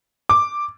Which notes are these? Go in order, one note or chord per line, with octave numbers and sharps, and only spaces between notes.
D6